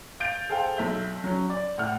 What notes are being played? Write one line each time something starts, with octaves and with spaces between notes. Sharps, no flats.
F5 G6 A6 D7
G#4 A4 C5 F5 G5
B1 E5 G6
F#3 C#4
D5
A2 F#5 F6